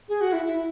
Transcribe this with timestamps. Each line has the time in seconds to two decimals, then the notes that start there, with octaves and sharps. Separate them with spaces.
0.09 G#4
0.21 F#4
0.33 E4
0.45 E4
0.56 E4